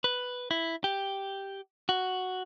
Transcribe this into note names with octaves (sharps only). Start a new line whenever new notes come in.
B4
E4
G4
F#4